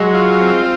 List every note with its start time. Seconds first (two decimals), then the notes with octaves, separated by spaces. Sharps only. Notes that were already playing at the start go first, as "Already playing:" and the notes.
Already playing: F#3 G#3
0.14 F4
0.41 C4